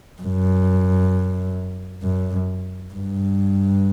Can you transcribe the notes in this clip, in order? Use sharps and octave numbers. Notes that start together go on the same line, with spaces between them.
F#2
F#2
G2